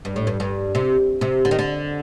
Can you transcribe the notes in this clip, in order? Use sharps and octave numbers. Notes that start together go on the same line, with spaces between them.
G2
A2
G2
G2
C3
C3
D3
D#3
D3